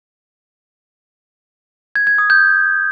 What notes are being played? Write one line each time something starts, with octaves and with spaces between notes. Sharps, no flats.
G#6
G#6
D#6
G6